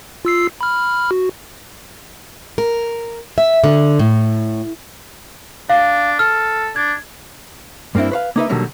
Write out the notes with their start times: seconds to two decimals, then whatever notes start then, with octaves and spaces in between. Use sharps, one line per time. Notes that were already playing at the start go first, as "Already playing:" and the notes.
0.25 F4 E6 C7
0.61 B5 F6
1.11 F#4
2.58 A#4
3.38 E5
3.64 D3
3.99 A2
5.70 D4 F5
6.19 A4 F6
6.76 D4 G#6
7.95 G2 A#3 C4 D4 E4
8.11 B4 C5 F5
8.36 A#3 D#4 B4 E5
8.49 B2 D3 D#3 F#3 G3 A#3